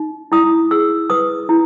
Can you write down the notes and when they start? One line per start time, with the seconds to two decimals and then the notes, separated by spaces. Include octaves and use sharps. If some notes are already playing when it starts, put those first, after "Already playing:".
Already playing: D#4
0.32 E4 D#6
0.71 G#4 E6
1.10 B4 D#6
1.49 E4